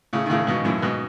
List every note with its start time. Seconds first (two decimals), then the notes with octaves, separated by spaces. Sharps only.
0.13 A2 C#3
0.26 D#3
0.30 A2 C#3
0.47 G#2 B2
0.65 F#2 A2
0.82 G#2 B2